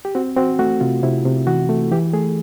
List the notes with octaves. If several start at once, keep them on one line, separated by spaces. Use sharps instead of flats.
G4
C4 F#4
C4 F#4
A3 F#4
C3 F4
C3 E4
C3
E3 F#4
A3
E3 G4
A3 G#4